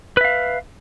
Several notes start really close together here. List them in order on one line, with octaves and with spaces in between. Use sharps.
B4 E5 F5